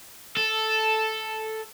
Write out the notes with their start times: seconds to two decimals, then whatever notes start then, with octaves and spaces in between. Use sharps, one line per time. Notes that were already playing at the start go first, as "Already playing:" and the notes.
0.37 A4